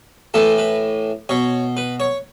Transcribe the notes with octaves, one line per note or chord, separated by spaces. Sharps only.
A2 E3 A4
B4
B2 C#5
B4
C#5